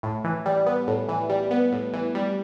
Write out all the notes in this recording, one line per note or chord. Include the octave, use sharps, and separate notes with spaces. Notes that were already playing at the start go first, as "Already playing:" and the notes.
A2
E3
G3
B3
A2
E3
G3
B3
A2
E3
G3